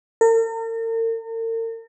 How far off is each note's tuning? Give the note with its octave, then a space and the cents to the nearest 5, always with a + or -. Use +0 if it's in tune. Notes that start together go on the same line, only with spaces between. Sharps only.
A#4 -45